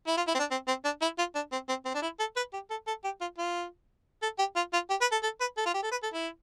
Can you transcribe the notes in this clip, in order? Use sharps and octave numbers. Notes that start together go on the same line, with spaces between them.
E4
F4
E4
C4
D4
C4
C4
D4
E4
F4
D4
C4
C4
C4
D4
E4
A4
B4
G4
A4
A4
G4
F4
F4
A4
G4
F4
F4
G4
B4
A4
A4
B4
A4
F4
G4
A4
B4
A4
E4